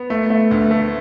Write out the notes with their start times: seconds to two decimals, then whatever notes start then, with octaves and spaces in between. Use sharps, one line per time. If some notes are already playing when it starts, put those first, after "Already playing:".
Already playing: B3
0.10 A3
0.30 A3
0.51 D2
0.71 A3